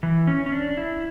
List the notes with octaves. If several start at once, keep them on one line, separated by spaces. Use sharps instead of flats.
E3
C#4
C#4
D4
E4